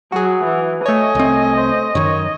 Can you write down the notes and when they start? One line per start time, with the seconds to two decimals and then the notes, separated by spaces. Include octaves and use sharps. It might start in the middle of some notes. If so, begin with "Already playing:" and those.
0.12 F#3 F#4 G#4
0.44 E3
0.86 A3 C#5 D#5 G#5
1.15 C2 C4
1.57 C5
1.95 F#2 D#3 C#5